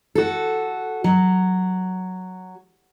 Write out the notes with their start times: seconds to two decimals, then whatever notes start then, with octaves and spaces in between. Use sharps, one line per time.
0.15 F#4 A4
1.04 F#3